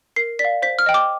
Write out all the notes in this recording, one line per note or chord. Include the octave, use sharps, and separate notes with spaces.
A#4 C7
D5 B6
F5
C5 B6
F6
D#5 G5
D6